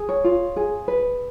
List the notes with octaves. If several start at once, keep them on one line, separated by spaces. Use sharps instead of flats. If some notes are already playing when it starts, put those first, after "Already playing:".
Already playing: G#4
C#5
F4
G#4
B4